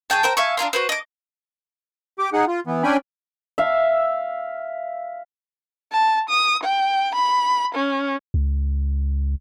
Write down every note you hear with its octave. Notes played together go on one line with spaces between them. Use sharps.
G#4 C#5 G5 A5
A#4 C5 G5
E5 F5 G#5 C#6
D4 F4 A#5 C6
F#4 B4 C5
D#5 D6
G4 D6
D#4 G#4 F#5
F4
E3 B3
C#4 D4 G5 G#5 B5
E5 F5
A5
D#6
G5
B5
C#4
C#2